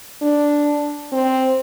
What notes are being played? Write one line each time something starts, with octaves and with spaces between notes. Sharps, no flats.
D4
C4